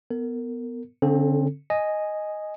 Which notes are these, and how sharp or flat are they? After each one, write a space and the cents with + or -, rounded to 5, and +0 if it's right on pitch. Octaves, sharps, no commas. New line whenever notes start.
B3 +0 A#4 -30
D3 -35 C4 +25 A4 +0
D#5 +0 G#5 +0